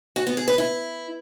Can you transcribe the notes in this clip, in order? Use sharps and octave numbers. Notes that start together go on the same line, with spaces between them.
F#4
B3
G#4
B4
E4